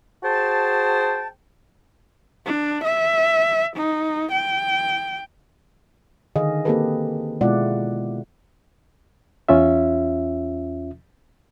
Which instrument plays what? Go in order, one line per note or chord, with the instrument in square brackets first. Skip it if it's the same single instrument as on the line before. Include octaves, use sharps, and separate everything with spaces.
[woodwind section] F#4 G#4 C5 G5 A5
[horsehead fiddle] D4
E5
D#4
G5
[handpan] D3 D#3 G#4 D#5 F5
A#3 C4 G4 A4 B4
B2 G#3 E4 F4 D5 F#5
[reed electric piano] E2 C#4 F4 E5